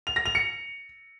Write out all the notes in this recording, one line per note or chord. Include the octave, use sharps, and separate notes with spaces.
F7
A#6
F7
C#7